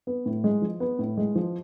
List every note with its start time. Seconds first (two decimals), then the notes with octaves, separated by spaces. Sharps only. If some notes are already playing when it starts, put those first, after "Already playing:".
0.07 B3
0.26 A2
0.44 G#3
0.62 F3
0.80 B3
0.99 A2
1.17 G#3
1.35 F3